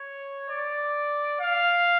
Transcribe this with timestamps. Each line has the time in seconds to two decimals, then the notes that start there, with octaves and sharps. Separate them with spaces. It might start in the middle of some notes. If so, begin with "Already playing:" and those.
Already playing: C#5
0.50 D5
1.40 F5